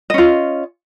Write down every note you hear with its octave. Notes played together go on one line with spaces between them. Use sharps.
C#4 F4 D#5